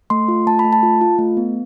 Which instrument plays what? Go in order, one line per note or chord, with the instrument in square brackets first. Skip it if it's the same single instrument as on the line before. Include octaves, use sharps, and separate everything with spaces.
[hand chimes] A3 C6
F4
A3 A5
B5
A3
A5
F4
F4
A3
B3